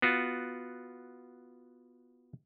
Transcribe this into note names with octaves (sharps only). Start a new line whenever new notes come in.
B3 F4 F#4